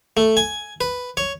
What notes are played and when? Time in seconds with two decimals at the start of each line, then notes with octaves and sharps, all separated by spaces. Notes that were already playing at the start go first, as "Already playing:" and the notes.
0.17 A3
0.37 G#5
0.81 B4
1.17 C#5